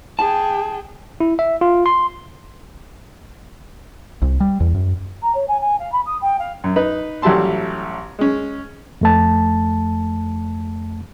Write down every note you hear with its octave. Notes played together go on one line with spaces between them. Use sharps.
G#4 G5 A5
E4
E5
F4
C6
C2
G3
E2
F#2
A#5
C#5
G#5
G#5
F5
B5
D#6
G5
F5
F#2
D#4 B4
A1 F#3 G3 E5 A5 C6
G#3 C#4
F2 A3 A5